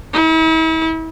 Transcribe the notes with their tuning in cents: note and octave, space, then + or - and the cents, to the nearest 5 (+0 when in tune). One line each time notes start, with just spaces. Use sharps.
E4 -40